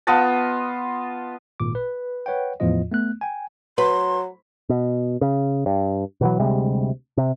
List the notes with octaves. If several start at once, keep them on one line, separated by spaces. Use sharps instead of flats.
B3 F4 D#5 A5
G#1 A#2 D6
B4
B4 C#5 F#5 G5
E2 A2 F3 F4 D#5
A3 B3 F#6
G5 G#5
F#3 B4 C6
B2
C#3
G2
B2 E3 F#3
D2 C3 G3 G#3
C3